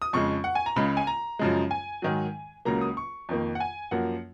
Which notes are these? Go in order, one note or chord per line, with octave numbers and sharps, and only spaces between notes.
D#6
F2 C#3 G#3 C#6
F#5
G#5
A#5
C#2 C#3 G#3 B5
G#5
A#5
F#2 C#3 F3 G#3
G#5
G#2 D#3 F#3
C#2 C#3 F#3 A#3 A#5
D#6
C#6
F2 D#3 A#3
F#5
G#5
F#2 F3 A#3 F#5